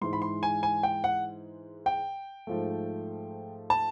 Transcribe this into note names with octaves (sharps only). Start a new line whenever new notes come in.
G#2 E3 G#3 C6
B5
C6
G#5
G#5
G5
F#5
G5
G#2 F3 A3
A5